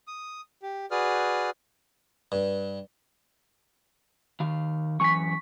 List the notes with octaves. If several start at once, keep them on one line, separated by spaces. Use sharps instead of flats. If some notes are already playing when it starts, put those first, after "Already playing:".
D#6
G4
F#4 G#4 B4 D5 D#6 F6
G2
D#3 F5
F#2 E3 G#5 C#6 B6